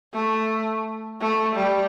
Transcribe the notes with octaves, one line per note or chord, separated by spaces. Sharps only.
A3
A3
G3